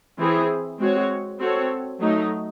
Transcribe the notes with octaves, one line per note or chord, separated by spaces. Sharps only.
E3 C4 E4 G#4
G#3 C4 F#4 C#5
C4 F#4 A4 C#5
F#3 A3 D#4